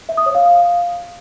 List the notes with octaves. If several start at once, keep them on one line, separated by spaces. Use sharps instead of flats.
E5
D#6
C#5
F5